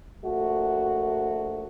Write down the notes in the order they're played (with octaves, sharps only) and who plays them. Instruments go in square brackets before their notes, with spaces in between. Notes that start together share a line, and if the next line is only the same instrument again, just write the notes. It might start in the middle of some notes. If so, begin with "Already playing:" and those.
[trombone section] A#1 A3 F#4